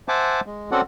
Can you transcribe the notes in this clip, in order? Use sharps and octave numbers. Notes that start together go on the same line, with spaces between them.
C5 E5 F#5 G#5 A5 D6
G#3
C4 C#4 F#4 A4 D5 F#5